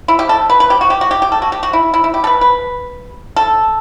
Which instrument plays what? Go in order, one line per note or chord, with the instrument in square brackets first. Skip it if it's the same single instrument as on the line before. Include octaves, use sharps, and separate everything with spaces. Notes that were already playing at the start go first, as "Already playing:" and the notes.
[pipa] E4
G4
A4
B4
B4
G4
F#4
G4
F#4
G4
G4
A4
F#4
G4
F#4
E4
E4
E4
G4
A4
B4
B4
A4